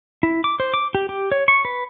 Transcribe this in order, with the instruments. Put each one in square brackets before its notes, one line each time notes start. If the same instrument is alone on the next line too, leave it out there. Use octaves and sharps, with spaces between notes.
[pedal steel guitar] E4
D6
C5
D6
G4
G4
C#5
C#6
B4